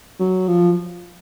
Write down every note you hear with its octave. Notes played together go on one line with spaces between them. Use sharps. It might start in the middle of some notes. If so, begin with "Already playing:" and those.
F#3
F3